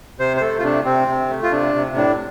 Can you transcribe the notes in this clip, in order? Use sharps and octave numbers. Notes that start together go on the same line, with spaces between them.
C3 C5
C5
A3 A4
F4
C3 D4
C3 C4
C3
A3
F4
C3 D4
C3
A2 D4